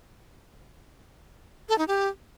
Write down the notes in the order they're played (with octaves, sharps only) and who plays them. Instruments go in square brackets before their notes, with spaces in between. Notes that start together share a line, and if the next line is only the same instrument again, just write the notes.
[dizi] A4
D#4
G4